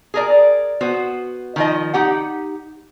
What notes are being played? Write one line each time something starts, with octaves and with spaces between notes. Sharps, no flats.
G#4 A#4 D5
B3 F#4 C5
D#3 F3 D#5
D#4 G4 F#5